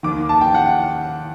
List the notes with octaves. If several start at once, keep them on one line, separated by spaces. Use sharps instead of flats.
D#2 D#3 D6
A5
G5
F#5